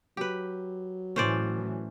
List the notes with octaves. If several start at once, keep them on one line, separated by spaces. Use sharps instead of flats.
F#3 G4 B4
A2 E3 C#4 C5 D5